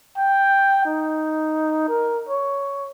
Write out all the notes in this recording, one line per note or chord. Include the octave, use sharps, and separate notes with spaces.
G5
D#4
A#4
C#5